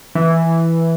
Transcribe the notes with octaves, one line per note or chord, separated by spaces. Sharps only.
E3